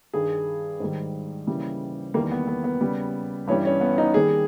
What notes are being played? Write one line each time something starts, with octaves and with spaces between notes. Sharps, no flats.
G2 D#3 G3 G#4
G#2 D#3 G3
D#2 C#3 E3 G3
E2 D#3 G3 A#3
B3
B3
B3
D#2 C#3 G3
G2 E3 G3 C#4
C#4
B3
D#4
D#2 D#3 G3 G#4